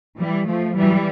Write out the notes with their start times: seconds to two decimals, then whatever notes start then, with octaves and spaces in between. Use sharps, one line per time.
0.19 E3 G3
0.47 F3 A3
0.77 E3 G3